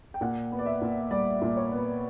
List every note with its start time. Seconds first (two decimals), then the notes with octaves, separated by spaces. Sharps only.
0.14 G5
0.21 A#2 F#5
0.52 B3
0.59 D5
0.66 E5
0.82 A#2
1.11 G3 D5
1.42 A#2
1.57 C#5
1.72 B3